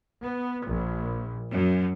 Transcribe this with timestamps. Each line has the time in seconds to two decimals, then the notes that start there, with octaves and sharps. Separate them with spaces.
0.21 B3
0.67 A#1
1.52 F#2